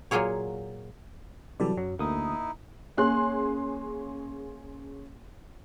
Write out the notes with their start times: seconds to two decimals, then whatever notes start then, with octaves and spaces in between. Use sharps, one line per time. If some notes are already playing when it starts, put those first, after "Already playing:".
0.11 A#2 F#3 A#3 F4 G#4 C#5
1.60 C3 E3 F#3 G3 A4 D5
1.78 F#2 F#3
1.99 D2 A#3 D#4 E4 D#6
2.97 A#3 C#4 G#4 C6 F#6